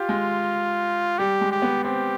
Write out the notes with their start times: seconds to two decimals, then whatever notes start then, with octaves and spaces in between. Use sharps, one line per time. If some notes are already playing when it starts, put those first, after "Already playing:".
Already playing: F4 G4
0.09 G#3
1.18 G3 G4
1.41 G#3
1.52 G4
1.62 B3
1.84 C4 G4